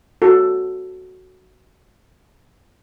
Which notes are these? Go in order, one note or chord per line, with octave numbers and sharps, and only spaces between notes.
F#4 A4